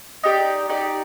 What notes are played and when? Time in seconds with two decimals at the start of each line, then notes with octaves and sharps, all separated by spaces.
0.23 D#4 G4 D5
0.69 D#4 G4 D5